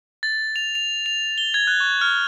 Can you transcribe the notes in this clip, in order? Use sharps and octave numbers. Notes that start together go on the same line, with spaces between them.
A6
F7
F7
F7
G7
G#6
F#6
C#6
F6